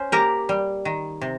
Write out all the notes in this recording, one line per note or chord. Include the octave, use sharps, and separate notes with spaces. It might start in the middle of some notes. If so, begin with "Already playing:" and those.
Already playing: C#4 C5
A#3 G4 A#4
G3
D#3
C3